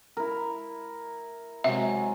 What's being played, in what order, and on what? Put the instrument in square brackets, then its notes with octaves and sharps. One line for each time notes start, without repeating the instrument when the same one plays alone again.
[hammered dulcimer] E4 A#4
[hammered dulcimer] C3 F#3 G#3 [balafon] E5